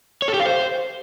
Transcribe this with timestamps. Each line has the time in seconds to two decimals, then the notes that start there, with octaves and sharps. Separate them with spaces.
0.22 C#5
0.28 A4
0.34 G4
0.40 F5
0.46 C5